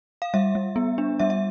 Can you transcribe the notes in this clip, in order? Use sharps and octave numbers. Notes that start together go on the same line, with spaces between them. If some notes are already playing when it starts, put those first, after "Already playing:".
F5
G3 E5
G3
B3
D4
G3 E5
E5